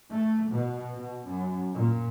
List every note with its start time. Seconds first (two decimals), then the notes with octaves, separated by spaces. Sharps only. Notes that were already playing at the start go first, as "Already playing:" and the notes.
0.11 A3
0.51 B2
0.96 B2
1.27 F#2
1.72 A#2